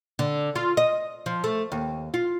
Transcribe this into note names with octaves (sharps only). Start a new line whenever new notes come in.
D3
F4
D#5
F3
A3
D#2
F4